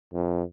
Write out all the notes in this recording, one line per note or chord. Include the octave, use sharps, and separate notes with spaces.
F2